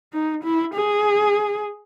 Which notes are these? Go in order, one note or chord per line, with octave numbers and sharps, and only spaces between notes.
D#4
E4
G#4